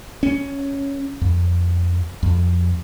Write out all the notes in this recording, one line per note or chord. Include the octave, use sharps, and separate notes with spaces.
C#4
F2
F2